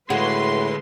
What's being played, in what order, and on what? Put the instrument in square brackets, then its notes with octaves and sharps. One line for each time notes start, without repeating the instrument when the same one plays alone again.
[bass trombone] A2 [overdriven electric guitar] D3 G#3 [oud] F#4 G#4 [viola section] B4 C6